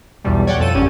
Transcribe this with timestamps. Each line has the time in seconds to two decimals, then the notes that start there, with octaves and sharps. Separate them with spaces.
0.24 B1 E2 B2 G3
0.47 C#5 D5 F#5 G5
0.58 F2 F3 A4 D#7
0.74 G#1 D3 C#4 G4